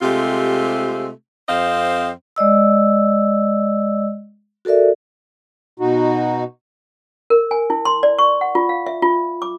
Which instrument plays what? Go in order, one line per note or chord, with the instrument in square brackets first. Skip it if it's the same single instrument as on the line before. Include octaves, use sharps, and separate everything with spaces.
[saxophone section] C3 G#3 A3 C4 F4 G4
F2 C4 C5 D#5 F5
[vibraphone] G#3 D5 D#5 E6
F#4 A4 A#4 D5 E5
[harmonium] B2 D#4 F#4
[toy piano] A#4
G#5
E4
C6
D5
C#6
F#5
F4
F5
E5
F4
D6